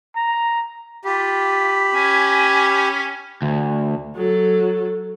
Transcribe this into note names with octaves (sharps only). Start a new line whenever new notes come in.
A#5
F4 G4 B5
C#4 G#5
D2
F#3 A4